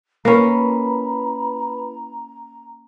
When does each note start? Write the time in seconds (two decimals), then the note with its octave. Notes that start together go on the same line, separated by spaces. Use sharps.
0.25 A#3 C#4 E4 B4 A#5 B5